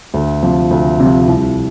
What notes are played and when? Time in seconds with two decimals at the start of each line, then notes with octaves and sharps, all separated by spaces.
0.14 D2
0.43 C3 F3
0.71 D2
1.00 C3 F3
1.28 C2